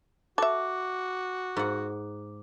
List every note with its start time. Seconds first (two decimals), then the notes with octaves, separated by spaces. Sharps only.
0.38 F#4 A4 E5 D6
1.57 G#2 F#5